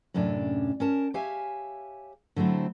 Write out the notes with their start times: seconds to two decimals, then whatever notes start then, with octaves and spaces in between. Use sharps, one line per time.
0.14 F#2 A2 C3 C#4 D4
0.80 C#4 A#4 A5
1.14 G4 C#5 E5 F5 G#5
2.36 D3 F#3 A3 C4 E4